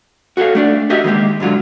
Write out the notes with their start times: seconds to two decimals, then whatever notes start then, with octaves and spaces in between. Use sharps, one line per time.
0.37 F#4 G#4 A4 C#5 F5
0.55 A3 D4 D5
0.90 F#4 G4 D#5 E5
1.04 D#3 G#3 A#3 G4
1.40 G#2 D3 F#3 F4